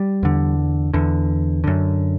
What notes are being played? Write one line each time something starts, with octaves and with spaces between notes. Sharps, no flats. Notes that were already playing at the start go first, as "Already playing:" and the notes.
Already playing: G3
E2 D3
E2 D3
F#2 D3